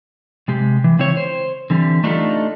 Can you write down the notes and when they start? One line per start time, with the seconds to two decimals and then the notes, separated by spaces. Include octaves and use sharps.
0.48 C3 G#3 G4
0.84 E3
0.99 C#3 C4 E4 C#5
1.17 C5
1.70 D3 E3 G3 C4
2.04 A3 D4 D#4 F4 G4 A4